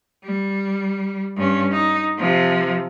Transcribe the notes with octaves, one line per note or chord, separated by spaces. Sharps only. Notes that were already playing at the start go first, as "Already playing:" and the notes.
G3
G2 C#4
D#4
C3 F3